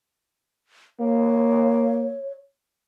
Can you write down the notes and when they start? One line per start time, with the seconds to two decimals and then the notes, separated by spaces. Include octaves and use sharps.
1.00 A#3 C#5